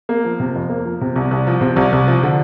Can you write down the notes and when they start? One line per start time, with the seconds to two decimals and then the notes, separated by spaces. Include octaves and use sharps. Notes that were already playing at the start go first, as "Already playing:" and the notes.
0.09 A#3
0.25 F3
0.40 C3
0.56 F2
0.70 A#3
0.85 F3
1.01 C3
1.16 C2
1.31 C2
1.47 F3
1.61 C3
1.76 C2
1.92 C2
2.08 F3
2.23 D3